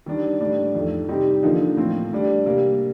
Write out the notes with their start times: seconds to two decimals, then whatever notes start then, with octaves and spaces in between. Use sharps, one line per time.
0.06 D#3 G3 D4
0.41 A2 G3 D4 G4
0.75 F2 D#3 A3
1.09 C3 G3 C4 D#4 G4
1.43 D3 F3 A#3 D#4
1.77 A2 F3 C4
2.11 A2 G3 D4
2.46 C3 G3 A#3